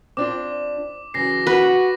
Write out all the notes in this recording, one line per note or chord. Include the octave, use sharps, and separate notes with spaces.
C4 D4 F4 D6
C#3 E3 F#3 A#6 C7
F#4 B4